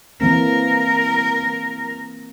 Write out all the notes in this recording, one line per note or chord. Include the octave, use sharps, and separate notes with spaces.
E3 A#3 C4 A#4